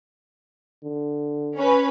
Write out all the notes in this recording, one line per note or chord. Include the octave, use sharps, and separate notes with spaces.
D3
C#4 B4